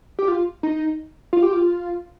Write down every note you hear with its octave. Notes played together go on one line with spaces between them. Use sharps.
G4
F4
D#4
F4
G4
F4